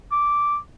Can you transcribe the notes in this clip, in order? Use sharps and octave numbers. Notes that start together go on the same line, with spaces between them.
D6